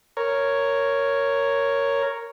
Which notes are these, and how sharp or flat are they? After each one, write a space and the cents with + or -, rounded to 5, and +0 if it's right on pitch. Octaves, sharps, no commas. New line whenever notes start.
A#4 -5 C#5 +0